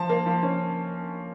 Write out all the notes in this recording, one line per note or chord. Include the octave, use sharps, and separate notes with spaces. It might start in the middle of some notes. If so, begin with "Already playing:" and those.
Already playing: F3 A5
A#3
F3
C#4